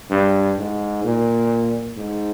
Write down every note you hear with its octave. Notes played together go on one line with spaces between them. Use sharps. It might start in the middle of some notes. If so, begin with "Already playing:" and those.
G2
G#2
A#2
G#2